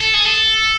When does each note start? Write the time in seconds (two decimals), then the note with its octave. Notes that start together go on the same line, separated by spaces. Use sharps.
0.01 A4
0.14 G#4
0.26 A4